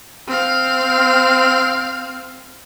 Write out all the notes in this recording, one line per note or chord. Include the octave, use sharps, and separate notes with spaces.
C4 F5